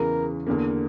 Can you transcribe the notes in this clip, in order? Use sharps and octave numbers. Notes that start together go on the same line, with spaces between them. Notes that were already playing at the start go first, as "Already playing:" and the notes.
Already playing: E2 C#3 E3 A#4
E2 D3 A#3